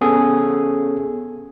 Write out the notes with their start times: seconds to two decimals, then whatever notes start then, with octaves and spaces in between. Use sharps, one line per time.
0.01 B3 C#4 G#4 A4